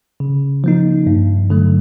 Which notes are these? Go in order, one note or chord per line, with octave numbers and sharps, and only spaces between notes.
C#3
F3 A#3 D#4
G2
D3 F#3 A3